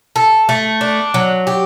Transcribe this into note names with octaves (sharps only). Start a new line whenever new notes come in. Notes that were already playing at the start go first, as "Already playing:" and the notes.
A4
A3
D4
F#3
G4